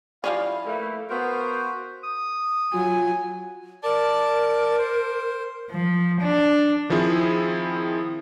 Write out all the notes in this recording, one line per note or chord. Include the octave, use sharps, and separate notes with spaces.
F3 G3 C#4 E4 F5
A3 A#3 B4
B3 F#4 A#4 C5 F5
D#6
F#3 F4 G#5
A#4 D5 A5
C5
F3
D4
D#3 F3 C4 E4 G#4